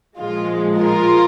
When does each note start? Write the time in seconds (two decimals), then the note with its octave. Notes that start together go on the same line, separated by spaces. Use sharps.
0.18 A#2 F3 G#3 F4
0.78 F4 A#4